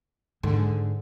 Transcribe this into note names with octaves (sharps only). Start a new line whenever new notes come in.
G#2 D3